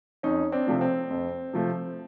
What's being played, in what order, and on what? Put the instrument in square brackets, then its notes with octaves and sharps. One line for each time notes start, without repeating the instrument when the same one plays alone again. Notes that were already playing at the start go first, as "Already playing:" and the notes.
[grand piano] F2 C#4 D#4
C4 D4
C3 F3 A3
C4
F2
C3 F3 A3